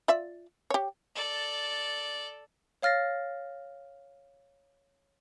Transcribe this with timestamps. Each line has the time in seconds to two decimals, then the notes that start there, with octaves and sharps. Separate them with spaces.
0.08 F4 D5 E5
0.70 G4 C#5
1.15 A4 D5
2.82 C#5 F5 F6 A6 A#6 C7